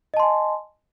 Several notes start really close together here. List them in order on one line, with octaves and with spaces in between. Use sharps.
D#5 A5 C6 G#5